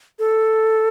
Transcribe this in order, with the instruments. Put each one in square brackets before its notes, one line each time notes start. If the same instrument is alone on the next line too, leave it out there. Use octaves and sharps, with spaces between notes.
[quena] A4